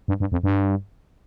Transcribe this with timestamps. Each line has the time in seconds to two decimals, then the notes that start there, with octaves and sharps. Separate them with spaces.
0.08 G2
0.20 G2
0.32 F2
0.43 G2